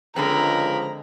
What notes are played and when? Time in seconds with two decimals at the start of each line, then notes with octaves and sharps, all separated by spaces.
0.16 C#2 D3 F3 G#3 C4 A#4 A#5 B5